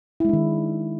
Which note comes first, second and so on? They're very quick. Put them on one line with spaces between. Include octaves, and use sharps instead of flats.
E4 G#3 D4 D#3